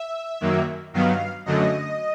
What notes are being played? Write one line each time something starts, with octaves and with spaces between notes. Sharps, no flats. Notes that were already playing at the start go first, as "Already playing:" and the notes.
Already playing: E5
F#2 D#3 F#3 A#3
G2 D#3 F#3 B3 F5
F#2 D3 F#3 A3 D#5